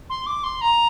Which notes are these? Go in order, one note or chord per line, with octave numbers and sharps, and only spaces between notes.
C6
D6
C6
A#5